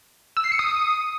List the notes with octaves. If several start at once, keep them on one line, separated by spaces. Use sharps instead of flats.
E6
C7
C#7
D#6